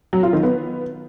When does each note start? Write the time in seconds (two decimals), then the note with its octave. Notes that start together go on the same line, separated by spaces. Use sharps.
0.13 F#3
0.23 F4
0.33 D#3
0.43 B3